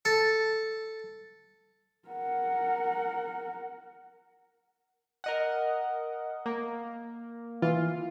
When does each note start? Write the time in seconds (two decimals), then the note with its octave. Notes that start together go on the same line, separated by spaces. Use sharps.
0.05 A4
2.08 A#4 F#5
5.24 A#4 D#5 F#5
6.46 A#3
7.62 E3 F4